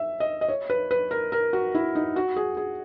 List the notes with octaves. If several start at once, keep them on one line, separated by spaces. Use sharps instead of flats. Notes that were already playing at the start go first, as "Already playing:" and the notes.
Already playing: E5
D#5
D#5
C#5
B4
B4
A#4
A#4
F#4
E4
D#4
F#4
G#4
G#4